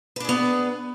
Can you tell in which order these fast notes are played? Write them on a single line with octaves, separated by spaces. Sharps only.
B4 D4 G#4 B3